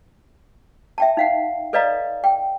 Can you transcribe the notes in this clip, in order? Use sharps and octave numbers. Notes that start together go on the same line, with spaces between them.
E5 G5 A5
D#4 F5 F#5
A4 B4 D5 D#5 F5 A#5
G5